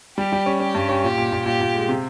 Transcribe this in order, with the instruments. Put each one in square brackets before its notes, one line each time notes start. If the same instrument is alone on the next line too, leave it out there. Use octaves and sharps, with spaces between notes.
[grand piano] G3 [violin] G4
[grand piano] G3
C#4
[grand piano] C#4 [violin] G4
[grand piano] G2
C#4
[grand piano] A#2 [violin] G4
[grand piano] A#2
A#2
[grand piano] A#2 [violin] G4
[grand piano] A#2
G#3
C3